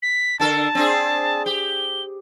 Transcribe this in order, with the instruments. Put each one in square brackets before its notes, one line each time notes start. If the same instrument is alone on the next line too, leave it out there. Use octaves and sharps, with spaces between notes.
[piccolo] B6
[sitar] D3 A4 A#4 [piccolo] A5
[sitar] C4 D4 G#4
[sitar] G4 [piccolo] G7